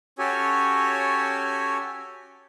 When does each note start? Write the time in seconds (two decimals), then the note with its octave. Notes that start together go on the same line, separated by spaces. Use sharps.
0.19 C#4 F#4 G4 A4 C#5 G#5